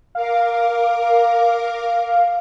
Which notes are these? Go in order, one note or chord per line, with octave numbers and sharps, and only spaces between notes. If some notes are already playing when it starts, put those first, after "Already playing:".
A#4 F5 D6